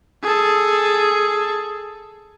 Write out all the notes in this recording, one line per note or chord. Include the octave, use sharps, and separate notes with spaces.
G#4 A4